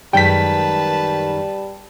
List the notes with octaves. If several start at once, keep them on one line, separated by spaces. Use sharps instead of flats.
F#2 D#3 G3 G#3 B4 G5 A5 B6